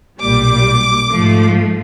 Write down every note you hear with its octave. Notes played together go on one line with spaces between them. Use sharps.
B1 A#2 G3 D6
G#2 F3 A3